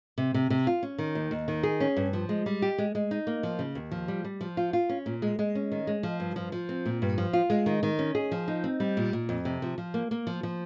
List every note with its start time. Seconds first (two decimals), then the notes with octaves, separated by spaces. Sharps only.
0.18 C3
0.34 C3
0.50 C3
0.67 F4
0.83 C#4
0.98 D#3
1.15 D#2
1.31 D#2
1.48 D#3
1.63 G#4
1.80 C#4
1.97 G2
2.13 F3
2.29 G#3
2.46 G3
2.62 G4
2.78 G#3
2.95 G#3
3.11 D#4
3.27 A#3
3.43 F3
3.59 C#3
3.75 D#2
3.91 F3
4.08 G3
4.24 G3
4.41 F3
4.57 F4
4.73 F4
4.89 C#4
5.06 A#2
5.22 G#3
5.39 G#3
5.55 C#4
5.72 D#3
5.87 G#3
6.03 F3
6.20 G2
6.36 F3
6.52 F3
6.69 C4
6.86 A#2
7.02 G2
7.18 F3
7.33 F4
7.50 G#3
7.66 D#3
7.83 D#3
7.99 C#4
8.15 G#4
8.31 F3
8.48 D#4
8.64 C4
8.80 G3
8.97 A#2
9.13 A#2
9.29 F2
9.45 C3
9.62 F3
9.78 F3
9.94 A#3
10.11 A#3
10.27 F3
10.43 F3